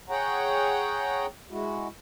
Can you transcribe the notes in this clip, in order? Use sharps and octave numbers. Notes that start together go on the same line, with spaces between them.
G#4 C#5 F#5 G5 A#5
G#3 E4 F#4